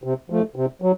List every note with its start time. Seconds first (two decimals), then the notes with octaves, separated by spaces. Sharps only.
0.04 C3
0.30 F3 A3
0.56 C3
0.82 F#3